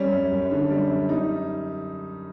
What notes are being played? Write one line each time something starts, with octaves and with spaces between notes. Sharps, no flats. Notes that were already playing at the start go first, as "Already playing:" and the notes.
Already playing: G3 C#4
F#2
F#2
D3
G3
F#2
G3 D#4